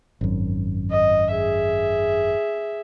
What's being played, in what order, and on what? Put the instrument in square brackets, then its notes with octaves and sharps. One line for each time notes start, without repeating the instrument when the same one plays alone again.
[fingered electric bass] G#1 F#2
[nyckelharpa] D#5
G#4 E5